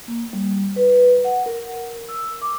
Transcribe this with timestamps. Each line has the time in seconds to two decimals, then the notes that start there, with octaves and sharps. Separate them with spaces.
0.08 A#3
0.33 G3
0.76 B4
1.24 F#5
1.46 A#4
2.09 E6
2.42 D6